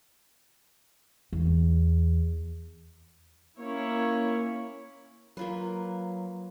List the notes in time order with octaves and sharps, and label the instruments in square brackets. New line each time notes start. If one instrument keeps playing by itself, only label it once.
[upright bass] E2
[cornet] A#3 [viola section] C#4 E4 C#5
[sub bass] F#3 [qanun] A#3 F4 B4